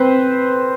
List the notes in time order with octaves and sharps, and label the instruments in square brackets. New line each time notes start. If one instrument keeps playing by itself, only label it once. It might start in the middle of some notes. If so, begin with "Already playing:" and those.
Already playing: [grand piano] C4 B4 C5